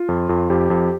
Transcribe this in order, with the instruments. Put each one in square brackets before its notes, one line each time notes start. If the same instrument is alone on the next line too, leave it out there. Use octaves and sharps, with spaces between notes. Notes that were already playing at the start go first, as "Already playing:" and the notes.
Already playing: [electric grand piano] F4
F2
F2
F2 G4
F2